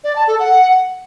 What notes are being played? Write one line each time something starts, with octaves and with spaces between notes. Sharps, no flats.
D5
A5
A4
F#5